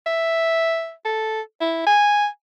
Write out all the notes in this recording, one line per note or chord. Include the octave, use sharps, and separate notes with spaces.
E5
A4
E4
G#5